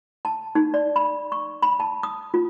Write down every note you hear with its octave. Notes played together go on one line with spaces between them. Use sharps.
A5
D#4
D5
B5
C#6
B5
A5
D#6
F4